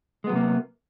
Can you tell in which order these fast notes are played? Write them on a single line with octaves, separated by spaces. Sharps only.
G#3 B3 F#3 C3 A#3